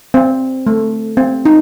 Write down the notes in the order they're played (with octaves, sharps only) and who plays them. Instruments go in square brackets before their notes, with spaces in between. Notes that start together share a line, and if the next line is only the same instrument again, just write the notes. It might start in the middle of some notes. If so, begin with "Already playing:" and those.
[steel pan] C4
A3
C4
D#4